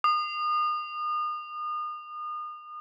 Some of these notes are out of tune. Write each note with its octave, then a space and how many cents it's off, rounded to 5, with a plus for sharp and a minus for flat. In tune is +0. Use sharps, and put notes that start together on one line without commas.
D#6 -35